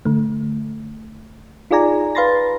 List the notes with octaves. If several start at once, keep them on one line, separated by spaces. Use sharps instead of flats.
D3 A3
D#4 F4 G#4 D5 G#5 A#5
B4 F5 B5 C6 A6 A#6